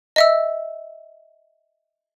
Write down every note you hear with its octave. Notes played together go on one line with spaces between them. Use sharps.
D#5 E5 E6